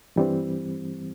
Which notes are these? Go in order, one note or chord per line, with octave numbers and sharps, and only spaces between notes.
G2 E3 G3 C4